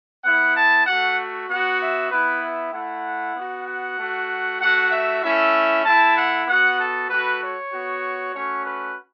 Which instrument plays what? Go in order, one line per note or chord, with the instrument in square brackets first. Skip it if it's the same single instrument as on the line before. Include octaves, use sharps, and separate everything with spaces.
[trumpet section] B3 E4 F#5
A5
A3 F#4 F#5
B3 F#4 F#5
E5
B3 E4 B4
E5
A3 E4 F#5
B3 F#4
F#5
A3 F#4
A3 F#4 F#5
E5
A3 C#4 E4 E5
A3 E4 A5
F#5
B3 F#4 F#5
A4
A3 F#4 B4
C#5
B3 F#4
A3 C#4 F#4 C#5
B4